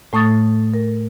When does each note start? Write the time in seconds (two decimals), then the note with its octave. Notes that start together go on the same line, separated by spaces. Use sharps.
0.13 A2 A3 C#6 D#6 A6
0.74 A#4